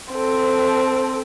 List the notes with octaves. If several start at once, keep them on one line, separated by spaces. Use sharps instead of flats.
C4 A4